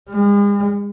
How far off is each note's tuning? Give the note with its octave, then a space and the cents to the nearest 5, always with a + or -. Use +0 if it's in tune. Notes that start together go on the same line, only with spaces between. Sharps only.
G#3 -40